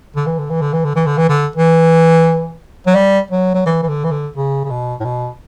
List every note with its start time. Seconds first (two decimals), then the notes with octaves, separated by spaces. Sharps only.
0.16 D3
0.26 E3
0.39 D3
0.50 E3
0.61 D3
0.73 E3
0.84 D3
0.95 E3
1.06 D3
1.17 E3
1.29 D3
1.56 E3
2.86 F#3
2.95 G3
3.30 F#3
3.54 F#3
3.66 E3
3.82 E3
3.88 D3
4.04 E3
4.11 D3
4.36 C#3
4.64 C#3
4.70 B2
5.00 A2
5.05 B2